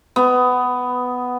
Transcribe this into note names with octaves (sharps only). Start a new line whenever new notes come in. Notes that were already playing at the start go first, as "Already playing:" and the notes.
B3